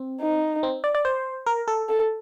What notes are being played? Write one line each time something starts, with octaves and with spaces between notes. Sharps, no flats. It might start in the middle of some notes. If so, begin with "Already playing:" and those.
Already playing: C4
D#4
C4
D5
D5
C5
A#4
A4
A4